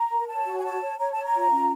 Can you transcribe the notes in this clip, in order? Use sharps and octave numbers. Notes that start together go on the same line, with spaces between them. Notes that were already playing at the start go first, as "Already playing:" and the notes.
Already playing: A#5
A#4
C#5 A5
F#4
G#5
C#5 A5
C#5
C#5 A#5
C#5 A5
A#5
F4
C#4